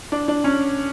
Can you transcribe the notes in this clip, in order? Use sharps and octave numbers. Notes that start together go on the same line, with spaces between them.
D4
D4
C#4